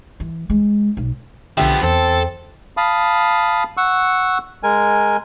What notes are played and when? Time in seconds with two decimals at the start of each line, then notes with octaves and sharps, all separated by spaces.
0.20 E3
0.50 G#3
0.97 B1
1.58 B1 D3 F3 B3 G4 E5
1.83 E2 C4 A4
2.77 F5 A5 B5 D#6
3.77 F#5 C#6 E6
4.63 G#3 A#4 G#5